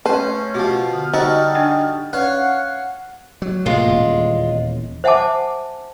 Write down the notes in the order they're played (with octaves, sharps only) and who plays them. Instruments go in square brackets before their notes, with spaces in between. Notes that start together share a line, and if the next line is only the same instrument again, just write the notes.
[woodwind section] A3 C4 C#4 [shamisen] B4 A5 [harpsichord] C5
[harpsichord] B2 F3 [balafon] F#4 G4
[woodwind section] D3 D#6 F6
[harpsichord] G3 F#4 A4 [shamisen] D#4 [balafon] C5
[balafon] D4 D#5 G5
[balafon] C#4 B4 D5 [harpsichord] C#5 F5 [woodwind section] F#5
[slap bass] F#3
[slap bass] A2 C3 A#3 [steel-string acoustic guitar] G#3 F4
[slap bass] D#1 E2
[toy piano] C5 E5 F#5 G#5 A5 D6